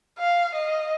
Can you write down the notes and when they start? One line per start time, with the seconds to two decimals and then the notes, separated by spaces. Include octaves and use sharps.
0.19 F5
0.55 D#5